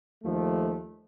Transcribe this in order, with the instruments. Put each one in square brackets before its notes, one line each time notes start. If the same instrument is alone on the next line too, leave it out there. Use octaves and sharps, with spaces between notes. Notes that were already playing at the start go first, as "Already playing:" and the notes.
[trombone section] D#2 F3 A3